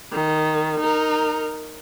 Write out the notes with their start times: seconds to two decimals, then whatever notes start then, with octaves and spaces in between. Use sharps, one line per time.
0.13 D#3
0.80 D#4 A#4